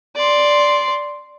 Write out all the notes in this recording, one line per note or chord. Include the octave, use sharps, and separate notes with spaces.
D5 C6